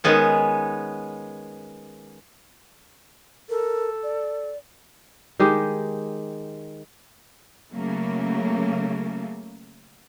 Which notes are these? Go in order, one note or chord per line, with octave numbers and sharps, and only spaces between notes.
D#3 G#3 B3 C#4
A4 A#4
D5
D#3 G#3 G4
C#3 F#3 A3 A#3